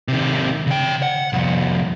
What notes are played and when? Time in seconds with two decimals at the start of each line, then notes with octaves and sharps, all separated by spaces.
0.08 C3 D#3
0.67 C#3 G5
1.03 F#5
1.33 C2 F2